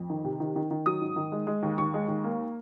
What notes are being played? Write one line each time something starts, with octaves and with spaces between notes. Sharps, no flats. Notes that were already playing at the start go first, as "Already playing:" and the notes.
Already playing: F2
D#3
C3
D#3
D#3
D#3
F#3 D#6
G#2
D#3
G#3
G#3
D#2
D#2 C#6
G#3
D#2
A#3